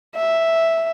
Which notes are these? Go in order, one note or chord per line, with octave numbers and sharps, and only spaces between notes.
E5